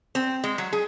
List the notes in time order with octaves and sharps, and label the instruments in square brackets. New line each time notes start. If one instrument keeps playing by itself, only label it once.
[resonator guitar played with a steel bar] C4
G#3
F#3
G#4